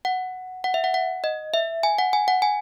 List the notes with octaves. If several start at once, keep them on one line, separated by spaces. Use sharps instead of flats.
F#5
F#5
E5
F#5
F#5
D#5
E5
G#5
F#5
G#5
F#5
G#5